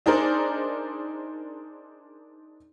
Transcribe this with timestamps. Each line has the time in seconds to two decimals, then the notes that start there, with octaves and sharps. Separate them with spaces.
0.06 D4 D#4 G#4 A#4 C5 D5